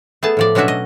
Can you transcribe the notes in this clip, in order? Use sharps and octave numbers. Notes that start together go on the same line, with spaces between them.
A3 B3 G#4 A5
A2 F3 D5
B2 F#3 C#4 D4 F#4 E5
D#5